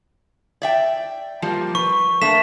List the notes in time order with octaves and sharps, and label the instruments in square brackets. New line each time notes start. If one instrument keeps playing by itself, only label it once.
[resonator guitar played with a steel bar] D5 E5 G5
F3 G3 A#3
[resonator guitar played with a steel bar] B4 [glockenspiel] C#6
[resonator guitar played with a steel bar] A3 A#3 D4 [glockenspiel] B6 E7